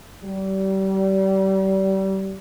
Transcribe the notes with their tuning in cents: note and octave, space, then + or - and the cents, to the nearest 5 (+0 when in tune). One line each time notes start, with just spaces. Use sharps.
G3 -30